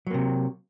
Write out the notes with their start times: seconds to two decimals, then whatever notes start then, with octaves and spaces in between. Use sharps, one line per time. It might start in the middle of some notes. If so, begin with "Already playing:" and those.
0.07 F#3
0.10 A#3
0.14 C3